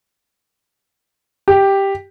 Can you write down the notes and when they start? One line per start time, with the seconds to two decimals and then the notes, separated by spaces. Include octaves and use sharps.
1.48 G4